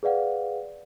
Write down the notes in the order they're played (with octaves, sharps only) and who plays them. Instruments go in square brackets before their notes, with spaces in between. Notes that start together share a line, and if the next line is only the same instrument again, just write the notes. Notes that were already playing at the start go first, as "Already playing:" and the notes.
[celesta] G#4 B4 D5 F5 F#5